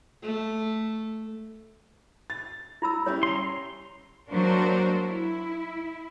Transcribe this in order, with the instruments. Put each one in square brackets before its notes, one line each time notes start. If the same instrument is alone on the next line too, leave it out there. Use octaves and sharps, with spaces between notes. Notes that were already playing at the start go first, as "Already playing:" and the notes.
[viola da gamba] A3
[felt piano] A6
[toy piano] E4 B5 E6
[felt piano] G3 C#4 E4 [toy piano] C#5
[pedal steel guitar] A#5 C6
[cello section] F#3 A#3 D4 F#4 A#4 C5
E4